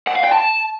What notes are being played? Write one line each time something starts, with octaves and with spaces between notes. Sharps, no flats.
F#5
F5
G5
A5